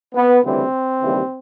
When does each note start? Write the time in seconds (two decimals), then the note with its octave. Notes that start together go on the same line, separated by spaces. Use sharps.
0.15 B3
0.43 D2 C#3 E3 G3 C4
1.00 D#2 C#3 E3 G3